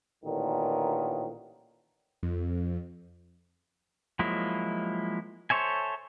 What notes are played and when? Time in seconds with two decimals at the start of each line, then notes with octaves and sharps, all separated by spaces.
0.24 A1 A#2 D3 D#3
2.23 F2
4.19 F3 F#3 G#3 A#3 E4
5.50 A4 C5 C#5 E5 G#5